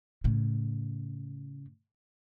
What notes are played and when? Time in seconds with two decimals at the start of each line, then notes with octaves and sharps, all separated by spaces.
0.24 A2 C#3